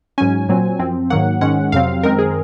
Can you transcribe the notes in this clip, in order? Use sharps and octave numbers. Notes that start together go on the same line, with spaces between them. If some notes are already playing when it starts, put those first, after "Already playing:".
G#2 F#3 C#4 G#5
A#2 F#3 C4
F#2 F3 C4
G#2 D#3 F#3 A#3 F#5
G#2 D#3 G#3 C#4 F#5
F2 C3 F#3 C4 F5
F#2 D#3 G#3 C4 A#4
G#4